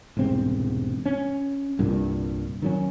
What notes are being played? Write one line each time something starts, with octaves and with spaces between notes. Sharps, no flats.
E1 C2 G#2 C4
C#4
C2 G2 A#2
D#3 F#3 C#4